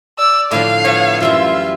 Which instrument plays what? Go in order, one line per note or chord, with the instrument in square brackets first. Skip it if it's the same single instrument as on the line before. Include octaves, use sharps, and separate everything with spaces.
[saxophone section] D5 [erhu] E6
[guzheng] A2 D3 F3 [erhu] F5
[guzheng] F3 [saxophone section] B3 C#5
[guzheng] F#2 E3 G3 [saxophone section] F4 [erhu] E5